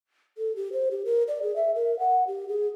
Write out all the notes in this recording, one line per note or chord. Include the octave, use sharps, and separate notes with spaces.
A4
G4
C5
G4
A#4
D5
G#4
E5
A#4
F#5
G4
G#4